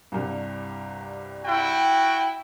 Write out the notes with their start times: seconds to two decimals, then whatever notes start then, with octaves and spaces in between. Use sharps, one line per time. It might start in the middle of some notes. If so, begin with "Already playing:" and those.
0.12 C2 G2 C3
1.44 E4 F#4 G5